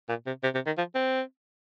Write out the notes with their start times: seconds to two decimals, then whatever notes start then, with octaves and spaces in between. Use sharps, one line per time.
0.09 A#2
0.26 C3
0.44 C3
0.55 C3
0.66 D#3
0.78 F3
0.95 C4